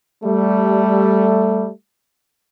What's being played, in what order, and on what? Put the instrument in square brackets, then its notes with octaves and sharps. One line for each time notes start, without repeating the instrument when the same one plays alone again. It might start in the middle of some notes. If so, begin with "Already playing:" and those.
[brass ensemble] G3 A3